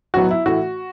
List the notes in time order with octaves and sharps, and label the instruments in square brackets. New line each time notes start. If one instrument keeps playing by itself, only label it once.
[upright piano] B1 A2 F#3 B3 [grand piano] F#4
[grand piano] E4
[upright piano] A2 E3 A3 E4 [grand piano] F#4